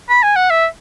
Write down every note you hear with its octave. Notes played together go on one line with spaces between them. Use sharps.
B5
G#5
F#5
E5